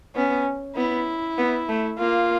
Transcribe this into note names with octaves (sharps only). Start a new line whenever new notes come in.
B3 C#4
B3 E4
B3
A3
A#3 F4